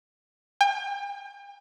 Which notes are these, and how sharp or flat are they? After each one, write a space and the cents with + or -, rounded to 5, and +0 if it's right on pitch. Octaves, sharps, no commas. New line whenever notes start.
G5 +40